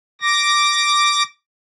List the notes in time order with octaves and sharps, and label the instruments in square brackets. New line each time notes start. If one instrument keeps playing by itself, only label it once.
[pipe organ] D6 A#6